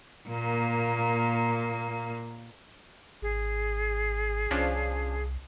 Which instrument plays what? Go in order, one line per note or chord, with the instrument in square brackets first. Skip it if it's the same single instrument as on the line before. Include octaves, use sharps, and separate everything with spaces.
[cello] A#2 A#3
[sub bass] G#1 [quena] G#4
[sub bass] C2 [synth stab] F3 C#4 D4